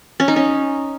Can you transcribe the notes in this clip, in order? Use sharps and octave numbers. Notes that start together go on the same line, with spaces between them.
C#4
D#4
C#4